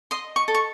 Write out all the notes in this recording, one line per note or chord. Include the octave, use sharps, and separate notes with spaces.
D#5 C6
C#6
A4
C#6